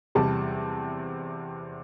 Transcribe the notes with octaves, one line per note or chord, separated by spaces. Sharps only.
E2 C3 G3 A5